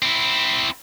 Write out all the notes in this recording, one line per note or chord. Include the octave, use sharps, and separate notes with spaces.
C4 E4